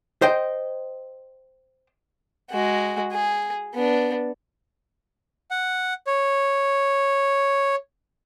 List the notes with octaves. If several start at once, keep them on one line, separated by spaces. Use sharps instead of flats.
C5 D#5 G5
G#3 F#4
G#4
B3 D4
F#5
C#5